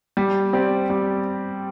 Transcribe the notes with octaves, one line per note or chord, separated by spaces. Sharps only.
G3
C4 G4 D5
G3